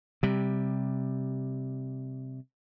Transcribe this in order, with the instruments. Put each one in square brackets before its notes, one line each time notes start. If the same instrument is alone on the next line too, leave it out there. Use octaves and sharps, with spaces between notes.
[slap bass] C3 G3